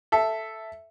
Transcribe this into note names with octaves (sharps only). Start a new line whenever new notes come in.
A4 E5